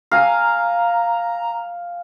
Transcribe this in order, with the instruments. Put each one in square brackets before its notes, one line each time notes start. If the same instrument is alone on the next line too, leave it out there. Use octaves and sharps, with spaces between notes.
[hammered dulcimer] F5 G#5 [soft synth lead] A#5